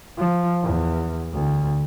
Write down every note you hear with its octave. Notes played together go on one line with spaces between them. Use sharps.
F3
E2
D2